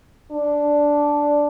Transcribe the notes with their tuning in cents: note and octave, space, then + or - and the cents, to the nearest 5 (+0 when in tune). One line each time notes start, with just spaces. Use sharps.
D4 -5